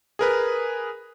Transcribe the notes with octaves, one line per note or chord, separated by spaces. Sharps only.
G#4 A#4 B4